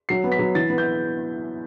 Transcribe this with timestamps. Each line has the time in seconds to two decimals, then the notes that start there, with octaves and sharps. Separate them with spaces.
0.09 F#3 C7
0.24 B3
0.32 B6
0.39 F#3
0.55 E3 A6
0.70 B3
0.78 G6